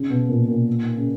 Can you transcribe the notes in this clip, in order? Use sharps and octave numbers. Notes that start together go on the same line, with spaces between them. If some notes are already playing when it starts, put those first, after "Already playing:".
Already playing: C#3
B2
A#2
A#2
C#3